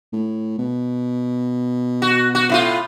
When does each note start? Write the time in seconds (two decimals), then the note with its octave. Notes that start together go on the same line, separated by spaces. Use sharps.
0.12 A2
0.58 B2
2.02 F#4
2.35 F#4
2.50 A2 E4 F4